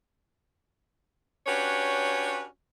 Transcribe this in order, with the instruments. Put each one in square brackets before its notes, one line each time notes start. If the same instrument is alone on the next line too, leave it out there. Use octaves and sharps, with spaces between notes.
[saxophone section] C#4 D4 F#4 G4 B4 C#5